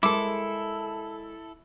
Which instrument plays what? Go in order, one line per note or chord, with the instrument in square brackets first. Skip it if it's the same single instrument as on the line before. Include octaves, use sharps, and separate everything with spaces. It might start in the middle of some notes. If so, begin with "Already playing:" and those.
[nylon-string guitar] G#3 A#4 C5 [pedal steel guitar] E4 A4 [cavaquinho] D6